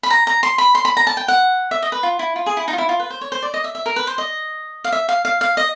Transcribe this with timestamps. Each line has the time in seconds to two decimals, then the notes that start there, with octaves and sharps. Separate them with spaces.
0.03 B5
0.10 A#5
0.27 A#5
0.43 C6
0.58 B5
0.75 C6
0.85 B5
0.97 A#5
1.07 A5
1.17 G5
1.28 F#5
1.71 E5
1.82 D#5
1.92 B4
2.03 F4
2.19 E4
2.36 F4
2.46 G#4
2.57 E4
2.68 D#4
2.73 F4
2.78 E4
2.89 F4
3.00 B4
3.10 C5
3.21 C#5
3.32 C5
3.42 D5
3.54 D#5
3.64 E5
3.75 E5
3.86 A#4
3.96 B4
4.07 C5
4.18 D#5
4.84 F5
4.92 E5
5.09 F5
5.25 F5
5.41 F5
5.57 D#5